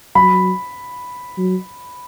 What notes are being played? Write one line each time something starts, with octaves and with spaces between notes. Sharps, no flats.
F#3 B5
F#3